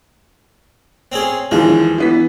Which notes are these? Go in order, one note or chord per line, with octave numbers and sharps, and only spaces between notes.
C4 C#4 G#4
D#2 E3 F3 G#3
E3 B3 B6